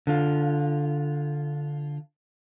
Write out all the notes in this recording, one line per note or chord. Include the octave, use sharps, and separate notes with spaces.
D3 F4